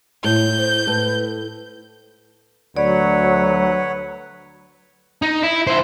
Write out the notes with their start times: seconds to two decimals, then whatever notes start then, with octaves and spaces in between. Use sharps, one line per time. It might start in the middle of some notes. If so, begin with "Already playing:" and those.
0.24 A2 E4 G6
0.58 C5
0.87 A2 B4
2.77 D2 F#3 B4 C#5 D5 F#5
5.22 D#4
5.43 E4
5.67 E4 C5